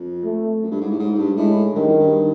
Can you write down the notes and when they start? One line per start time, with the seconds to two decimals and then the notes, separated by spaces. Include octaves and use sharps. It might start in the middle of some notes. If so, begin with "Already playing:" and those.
Already playing: F2
0.24 A3
0.63 F#2
0.72 G2
0.81 G#2
0.91 A2
0.99 G#2
1.15 G#2
1.18 G2
1.37 A2 G#3
1.74 G2 D#3
1.88 F#2
2.00 G2